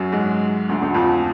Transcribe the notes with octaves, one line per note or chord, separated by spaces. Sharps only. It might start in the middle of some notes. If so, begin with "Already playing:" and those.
Already playing: F#2 F#3
G#2 G#3
D2 D3
D2 D3
F2 F3